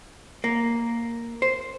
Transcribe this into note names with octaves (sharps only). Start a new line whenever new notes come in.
A#3
C5